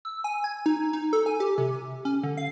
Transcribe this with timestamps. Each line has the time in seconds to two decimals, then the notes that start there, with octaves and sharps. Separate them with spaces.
0.05 E6
0.24 G#5
0.44 G#6
0.66 D#4
0.93 D#4
1.13 A4
1.26 G#5
1.40 G4
1.58 C3
2.05 C#4
2.23 D3
2.37 F5